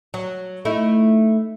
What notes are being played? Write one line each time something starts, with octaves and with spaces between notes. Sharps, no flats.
F#3
A3 D#4 E4